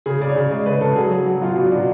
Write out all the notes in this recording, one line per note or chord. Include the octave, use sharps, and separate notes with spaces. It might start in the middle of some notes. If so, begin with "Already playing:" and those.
C#3 G#4
C#3 D5
C#5
C#3
G#3 D5
C#3 B4
C#3 A4
F#3 G#4
F#3
F#3
B2 F4
B2
D4
B2